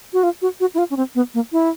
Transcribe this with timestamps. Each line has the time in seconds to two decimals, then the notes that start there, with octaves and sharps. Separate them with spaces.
0.13 F#4
0.23 F4
0.42 F#4
0.60 F#4
0.75 E4
0.78 F4
0.90 C#4
0.97 C4
1.15 B3
1.34 A#3
1.52 E4